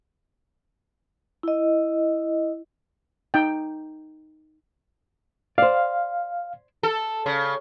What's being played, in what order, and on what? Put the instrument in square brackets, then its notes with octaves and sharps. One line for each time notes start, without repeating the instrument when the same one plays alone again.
[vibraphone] E4 D#5
[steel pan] D#4 G5
[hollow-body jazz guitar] C5 D5 [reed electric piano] F5
[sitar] A4
C#3